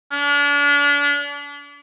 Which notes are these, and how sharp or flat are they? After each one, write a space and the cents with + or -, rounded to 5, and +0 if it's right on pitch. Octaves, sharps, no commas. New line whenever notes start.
D4 -40